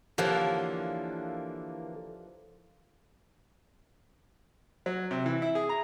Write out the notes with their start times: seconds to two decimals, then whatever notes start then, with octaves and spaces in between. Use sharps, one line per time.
0.18 D3 E3 F3 A#3 G4 A#4 C#5
4.86 F#3
5.11 C3
5.26 E3
5.42 E4
5.55 G#4
5.69 A#5